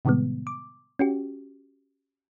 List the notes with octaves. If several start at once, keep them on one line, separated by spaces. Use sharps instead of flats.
A2 C3 D#3 G3 G#3 B3
D6
C#4 F#4 G4